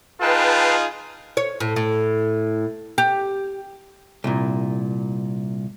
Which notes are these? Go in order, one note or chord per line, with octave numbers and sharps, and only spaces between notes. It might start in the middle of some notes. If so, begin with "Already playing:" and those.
D#4 F4 G#4 B4 G5 A5
C#5
A2
A2
G4
C2 A#2